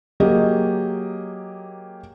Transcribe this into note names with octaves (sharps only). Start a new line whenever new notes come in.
F#3 A#3 G4 G#4 D#5